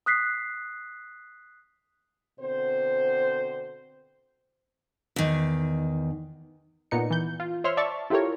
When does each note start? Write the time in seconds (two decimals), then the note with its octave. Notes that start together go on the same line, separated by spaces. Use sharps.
0.06 D#6 F#6 B6 C7
2.39 B2 D3 C4 C5
5.16 E2 D#3
6.91 A#2 B3 D#4 C#7
7.10 E3 G6
7.40 F4
7.64 C5 C#5 E5 C6 F6
7.77 D5 E5 A5 C#6
8.10 E4 F4 G4 A4 A#4 C#5